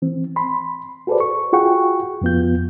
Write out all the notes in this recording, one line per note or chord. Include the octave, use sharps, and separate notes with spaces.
E3 C4
B5 C6
F#4 G#4 A4 B4 C5 D5
C#6
F4 F#4 G#4 F#5 G5 C#6
F2 F3 B3 F4 G6